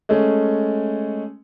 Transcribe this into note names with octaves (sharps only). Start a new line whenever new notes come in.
G#3 A3 C#4